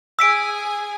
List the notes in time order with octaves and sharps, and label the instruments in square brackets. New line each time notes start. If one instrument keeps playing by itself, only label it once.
[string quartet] G#4 G#5 [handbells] E6 B6 D7